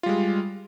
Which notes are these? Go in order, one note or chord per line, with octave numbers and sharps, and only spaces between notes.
G3 G#3 F4